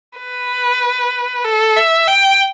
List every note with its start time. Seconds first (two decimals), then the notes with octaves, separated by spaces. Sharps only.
0.19 B4
1.44 A4
1.77 E5
2.07 G5